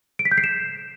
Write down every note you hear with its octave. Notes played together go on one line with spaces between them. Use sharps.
D7
B6
G6
C7
E7